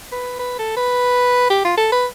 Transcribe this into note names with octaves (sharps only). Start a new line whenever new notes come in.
B4
B4
A4
B4
G4
F4
A4
B4